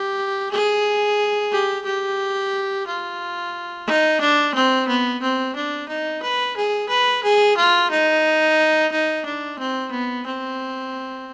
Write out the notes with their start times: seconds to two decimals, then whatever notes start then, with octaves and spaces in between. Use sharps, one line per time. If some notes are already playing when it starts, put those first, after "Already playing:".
Already playing: G4
0.52 G#4
1.52 G4
1.85 G4
2.87 F4
3.87 D#4
4.21 D4
4.55 C4
4.88 B3
5.22 C4
5.56 D4
5.88 D#4
6.22 B4
6.56 G#4
6.89 B4
7.24 G#4
7.57 F4
7.91 D#4
8.92 D#4
9.25 D4
9.59 C4
9.91 B3
10.26 C4